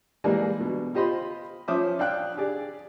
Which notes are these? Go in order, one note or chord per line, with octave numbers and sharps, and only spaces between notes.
E3 G3 G#3 A#3 D4
B2
F4 G4 C5 D#5 B5 C6
F3 C#4 C5 E5 D6 D#6
D4 F5 G5 F#6
G4 G#4 D5